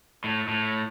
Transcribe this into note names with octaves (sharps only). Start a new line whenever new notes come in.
A2
A2